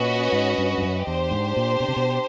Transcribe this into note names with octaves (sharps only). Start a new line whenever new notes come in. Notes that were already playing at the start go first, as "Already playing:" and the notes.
Already playing: A#2 C#4 F#4 B4 D#5
G#2
G2
G2
F#2
E2 D4 G4 C5
G#2
A#2
B2
C3
B2